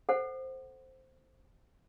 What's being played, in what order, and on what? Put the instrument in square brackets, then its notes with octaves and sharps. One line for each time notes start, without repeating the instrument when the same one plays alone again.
[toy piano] A4 C5 F#5